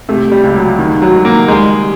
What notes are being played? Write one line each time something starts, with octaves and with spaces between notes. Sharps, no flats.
C3 A3
G3
C#2
F#3
D#3
F#3
D#3
A#3
G3 G#3